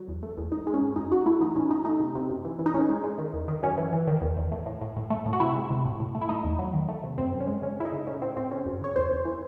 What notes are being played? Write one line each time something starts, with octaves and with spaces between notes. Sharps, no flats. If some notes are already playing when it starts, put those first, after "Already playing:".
Already playing: F#3
E2
A3
E2
G#2 D#4
G#3
C#4
G#2
F#2 D#4
F#2 F#4
A3 E4
E3 D#4
A2 C#4
E3 D#4
A3 D#4
C3
C3
F#2
E3
E3
D#4
A2 C#4
G#3
G#3
D#3
E2
D#3
F#2 C#4
E3
E3
D#3
E2
E2
A2
A2
A2
A2
A3
A2
F#4
C3 E4
G#3
C3
A2
A2
A3
E4
A3 D#4
E2
F#3
D#3
A3
C3
F#2 C4
F#2
C#4
G#3
C#3 C#4
C#3 E4
D#4
C#3
A2 C#4
A2 C4
A2 C4
C#3 C#4
F#2
C#3 C#5
E2 C5
E2
E3